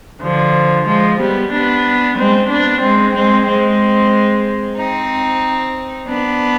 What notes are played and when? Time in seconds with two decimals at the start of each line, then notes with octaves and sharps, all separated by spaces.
0.22 D3 F3
0.87 F3 G#3
1.20 G3 B3
1.52 B3 D4
2.18 G#3 C4
2.50 B3 D4
2.82 G#3 C4
3.15 G#3 C4
3.47 G#3 C4
4.77 C4 D#4
6.07 B3 D4